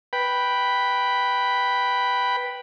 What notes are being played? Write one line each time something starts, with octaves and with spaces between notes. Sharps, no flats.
B4 G5 B5